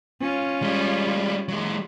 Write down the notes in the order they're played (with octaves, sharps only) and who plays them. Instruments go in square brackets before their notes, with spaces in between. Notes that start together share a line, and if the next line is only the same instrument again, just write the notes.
[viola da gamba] C#4 F4
[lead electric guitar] G3 G#3
F#3 G#3